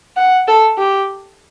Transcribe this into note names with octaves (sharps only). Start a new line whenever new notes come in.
F#5
A4
G4